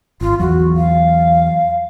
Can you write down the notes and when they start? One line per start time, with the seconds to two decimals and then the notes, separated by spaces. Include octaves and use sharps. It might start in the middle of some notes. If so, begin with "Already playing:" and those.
0.21 G#1 F4
0.39 E2 F#3 F#4
0.76 F5